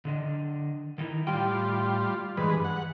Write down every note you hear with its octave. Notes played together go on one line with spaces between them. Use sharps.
D3 D4 D#5
D#3 D#4 E4
A2 G3 F4 G5
G2 E3 G#3 B4
F#5